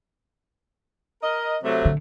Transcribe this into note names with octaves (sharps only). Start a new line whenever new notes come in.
A#4 D#5
C3 F#3 A3
D3